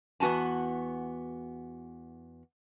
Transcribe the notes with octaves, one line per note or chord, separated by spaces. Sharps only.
E2 B3 F#4 G#5 A5